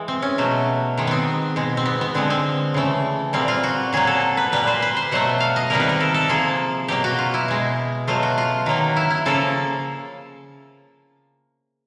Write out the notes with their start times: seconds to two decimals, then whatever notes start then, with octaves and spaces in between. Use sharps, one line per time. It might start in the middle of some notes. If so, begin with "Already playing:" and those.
Already playing: E3 G#3
0.08 C4
0.22 C#4
0.38 B2 F#3 A3
0.97 D#3 G#3
1.07 B3 C4
1.56 B2 G#3
1.77 C4
1.85 B3
2.01 B3
2.14 D3 F3 G#3 C4
2.30 C4
2.74 C#3 E3 A3
3.33 A#2 G3 A#3 C4
3.48 F4
3.63 F#4
3.93 A#2 F#3 A#3 G#4
4.07 A4
4.37 B4
4.52 A#2 G3 A#3 B4
4.67 C5
4.82 B4
4.97 C5
5.11 B2 F#3 A3 F#5
5.40 F5
5.56 D#5
5.70 C3 D#3 G3 A#3 A#4
5.80 B4
5.89 A#4
6.00 A4
6.14 A4
6.28 C3 F3 A#3 G#4
6.88 B2 F#3 A#3 G4
7.04 F#4
7.19 F4
7.34 E4
7.48 B2 G#3
8.07 B2 F#3 A3 F4
8.23 F#4
8.38 F4
8.66 D#3 F#3 A#3
8.96 E4
9.10 E4
9.25 C#3 F3 A#3 A4